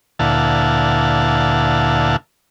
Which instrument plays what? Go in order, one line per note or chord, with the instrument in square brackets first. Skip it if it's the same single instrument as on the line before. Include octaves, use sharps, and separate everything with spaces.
[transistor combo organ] D2 A#2 E4 F5 F#5 A5